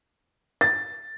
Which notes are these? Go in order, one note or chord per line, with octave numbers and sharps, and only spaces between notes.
A6